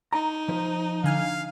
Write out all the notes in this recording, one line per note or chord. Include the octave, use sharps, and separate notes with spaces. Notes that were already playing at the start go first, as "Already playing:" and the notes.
D#4 A#5
F3 C5
D3 F5 G#5 F6